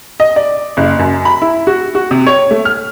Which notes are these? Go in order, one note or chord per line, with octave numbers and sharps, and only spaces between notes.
D#5
D5
F#1
F#2
B5
E4
F#4
F#4
C3
C#5
A3
F6